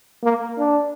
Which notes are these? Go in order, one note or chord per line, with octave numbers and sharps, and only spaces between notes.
A#3
D4